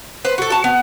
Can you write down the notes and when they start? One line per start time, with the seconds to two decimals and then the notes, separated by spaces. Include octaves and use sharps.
0.25 B4 C5
0.38 F#4 A4
0.50 F#4 A5
0.64 B3